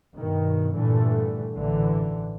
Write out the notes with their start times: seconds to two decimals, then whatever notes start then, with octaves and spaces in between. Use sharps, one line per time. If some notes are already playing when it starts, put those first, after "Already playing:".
0.16 G2 B2 D#3
0.73 G2 A#2 D3 E3 A3
1.54 A1 D3 E3